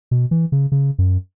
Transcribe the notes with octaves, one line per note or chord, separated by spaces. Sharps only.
B2
E3
C#3
C#3
F#2